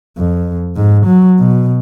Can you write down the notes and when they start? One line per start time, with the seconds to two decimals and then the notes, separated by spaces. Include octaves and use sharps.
0.18 F2
0.76 G#2
1.06 F#3
1.39 B2